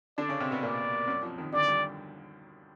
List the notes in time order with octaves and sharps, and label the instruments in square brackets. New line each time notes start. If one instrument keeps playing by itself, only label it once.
[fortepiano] D3 D4 [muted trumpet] D5
[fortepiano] C#3 C#4
C3 C4
B2 B3
[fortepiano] A#2 A#3 [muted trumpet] D5
[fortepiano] F#2 F#3
F2 F3
D#2 D#3
[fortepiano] D2 D3 [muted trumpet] D5
[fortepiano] G3